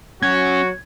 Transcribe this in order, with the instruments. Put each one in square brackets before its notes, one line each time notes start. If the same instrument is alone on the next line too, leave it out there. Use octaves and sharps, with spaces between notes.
[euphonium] F#3 [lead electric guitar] C#4 [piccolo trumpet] F#4 [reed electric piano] G#6